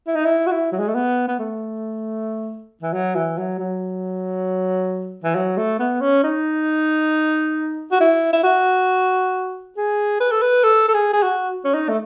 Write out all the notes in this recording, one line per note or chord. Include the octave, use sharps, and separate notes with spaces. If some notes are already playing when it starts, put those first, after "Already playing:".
E4
D#4
E4
F#4
E4
F#3
G#3
A3
B3
B3
A3
E3
F#3
E3
F#3
F#3
E3
F#3
A3
B3
C#4
D#4
F#4
E4
E4
F#4
G#4
B4
A4
B4
A4
A4
G#4
G#4
F#4
C#4
D#4
A3